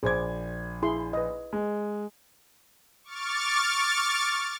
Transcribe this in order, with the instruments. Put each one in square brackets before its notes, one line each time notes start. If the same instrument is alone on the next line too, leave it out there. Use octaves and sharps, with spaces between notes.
[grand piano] A#1 G#6 [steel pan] G#4 C5 D6
[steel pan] E4 G#4 C6
B4 D#5
[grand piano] G#3
[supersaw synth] C#6 D6 F6 A6